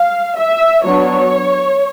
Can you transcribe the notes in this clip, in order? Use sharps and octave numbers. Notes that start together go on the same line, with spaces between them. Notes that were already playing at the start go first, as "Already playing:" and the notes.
Already playing: F5
E5
F#3 B3 D4 C#5